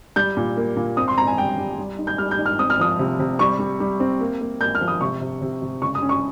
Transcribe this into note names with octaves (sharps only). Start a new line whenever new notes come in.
G3 G6
A#2
A#3
A#2
C4 D#6
C6
C4 A#5
G#5
G3 G5
G3
G3
D#4
G6
G3 F6
G6
D#4
F6
C4 D#6
F6
F3 D#6
C3
C3
G3 C#6
G3
G3
C4
A#3
A#3
A#3 G6
F6
F3
D#6
C3 C#6
C3
C3
C3
C#3 C#6
D#6
C#4
C#6